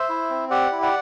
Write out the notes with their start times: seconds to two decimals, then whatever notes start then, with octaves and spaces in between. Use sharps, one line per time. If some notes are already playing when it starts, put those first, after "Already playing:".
Already playing: C5 E5
0.09 E4
0.30 C4
0.50 G4 D5 F#5
0.72 E4
0.82 D5 F#5